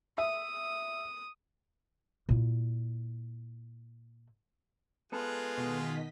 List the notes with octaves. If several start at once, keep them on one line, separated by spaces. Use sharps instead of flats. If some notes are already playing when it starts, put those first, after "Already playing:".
E5 D#6
A#2 E4
G#3 B3 F4 G#4 A4 B4
B2 D#3 D#5 B6